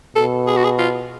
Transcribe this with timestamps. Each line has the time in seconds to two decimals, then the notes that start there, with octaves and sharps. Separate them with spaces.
0.15 B2 A4
0.47 G#4
0.56 F#4
0.64 G#4
0.79 F4